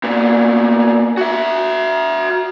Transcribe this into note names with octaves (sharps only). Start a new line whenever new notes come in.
A#2 B3
F#4 E5